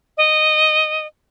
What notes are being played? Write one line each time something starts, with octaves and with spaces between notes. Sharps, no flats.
D#5